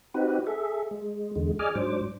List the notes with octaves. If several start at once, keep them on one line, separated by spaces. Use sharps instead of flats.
C4 D#4 F#4 G4 B4
G#4 A4 E5
G#3
E2 D3 G#3
G#4 D5 D#5 G#5 D6 F6
G#2 F#3 D4 C5 D6